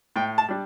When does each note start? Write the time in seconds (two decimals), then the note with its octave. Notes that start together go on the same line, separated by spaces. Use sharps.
0.16 A2 G5
0.38 A5
0.49 G3 D4